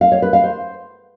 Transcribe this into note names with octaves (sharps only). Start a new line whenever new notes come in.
F5
C#5
B4
F5
C5